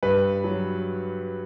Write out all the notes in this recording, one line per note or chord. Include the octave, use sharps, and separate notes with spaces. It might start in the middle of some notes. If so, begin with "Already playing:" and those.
G2 B4
F#3